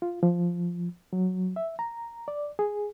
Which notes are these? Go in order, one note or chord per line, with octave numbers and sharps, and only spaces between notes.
F4
F3
F#3
E5
A#5
D5
G#4